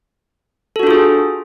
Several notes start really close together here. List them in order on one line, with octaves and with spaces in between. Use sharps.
A4 F#4 D4 F4 G#4